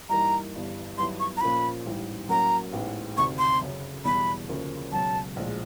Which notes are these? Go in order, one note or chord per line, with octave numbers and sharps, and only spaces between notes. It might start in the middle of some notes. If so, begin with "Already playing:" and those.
G2 E3 G3 A#3 D#4 A#5
G1 G2 E3
G2 D#3 F#3 B3 E4 C6
C#6
A#5
A#2 F3 A#3 C#4 F4 B5
A1 G#2 E3 G3
A2 F#3 A#3 C#4 F#4 A#5
A1 G#2 E3 G#3 B3
D2 C3 D#3 C#6
C6
F#2 C#3 F#3
E2 B2 G3 B5
D2 C#3 F3 A#3 C#4
C#2 B2 F#3 A5
A#1 A2 F3 G#3